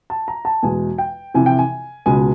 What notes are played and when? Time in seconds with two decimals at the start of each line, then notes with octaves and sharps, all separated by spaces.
0.10 A5
0.28 A#5
0.45 A5
0.63 E2 B2 G#3 G#5
0.98 G5
1.34 F2 C3 E3 G#5
1.46 G5
1.59 G#5
2.06 C#2 B2 G#3 G#5